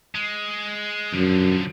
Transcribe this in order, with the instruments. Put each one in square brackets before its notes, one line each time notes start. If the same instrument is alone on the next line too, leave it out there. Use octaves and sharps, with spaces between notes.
[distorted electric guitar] G#3
[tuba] F#2 [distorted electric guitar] D3 F3